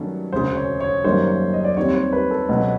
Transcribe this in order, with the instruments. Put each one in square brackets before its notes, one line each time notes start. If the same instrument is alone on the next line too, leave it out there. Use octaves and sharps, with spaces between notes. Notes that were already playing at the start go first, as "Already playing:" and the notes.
Already playing: [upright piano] G2 D#3 F#3 A3 C#4
[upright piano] E1 D2 C#3 [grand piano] C5
[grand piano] C#5
C#5
[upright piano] F#1 F#2 D#3 G3 A#3 [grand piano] C5
[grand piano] D#5
D5
[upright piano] D#2 D#3 G3 C4 [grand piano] C#5
[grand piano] C5
B4
A4
[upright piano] C#2 B2 F#3